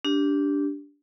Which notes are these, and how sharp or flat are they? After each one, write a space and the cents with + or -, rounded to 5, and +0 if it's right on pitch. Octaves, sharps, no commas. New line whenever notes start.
D4 -15 G4 +0